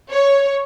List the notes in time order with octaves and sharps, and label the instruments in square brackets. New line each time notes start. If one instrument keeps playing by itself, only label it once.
[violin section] C#5